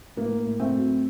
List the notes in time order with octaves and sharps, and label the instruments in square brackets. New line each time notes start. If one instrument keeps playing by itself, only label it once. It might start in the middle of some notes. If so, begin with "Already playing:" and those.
[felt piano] A2 A#3
A2
A3 C4
F#3